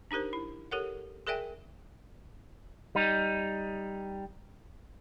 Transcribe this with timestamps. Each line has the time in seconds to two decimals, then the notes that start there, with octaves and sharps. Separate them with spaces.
0.11 D4 D#4 G4 A#4 C5
0.33 E4
0.72 G4 A4 A#4 C#5 F#5
1.27 G#4 A#4 D5 E5 G5 G#5
2.95 G3 D#4